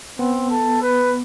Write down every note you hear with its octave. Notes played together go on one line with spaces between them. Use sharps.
B3 C4
A4
B4